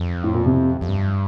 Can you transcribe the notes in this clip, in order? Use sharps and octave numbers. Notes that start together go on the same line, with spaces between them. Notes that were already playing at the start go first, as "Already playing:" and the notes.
Already playing: F2
A2
A#2
C3
F2
G2